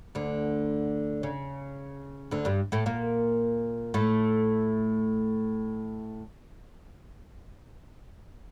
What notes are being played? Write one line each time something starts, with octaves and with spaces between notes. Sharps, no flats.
D2 D3
C#3
D2 D3
G2 G3
A2 A3
A#2 A#3
A2 A3